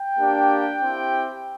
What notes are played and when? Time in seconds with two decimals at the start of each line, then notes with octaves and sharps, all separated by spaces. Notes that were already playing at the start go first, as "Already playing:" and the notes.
Already playing: G5
0.18 A#3 D4 G4
0.79 C4 E4 G4